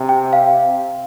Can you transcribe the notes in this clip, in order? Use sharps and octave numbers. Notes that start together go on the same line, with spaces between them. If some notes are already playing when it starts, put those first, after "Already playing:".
Already playing: C3
G5
F5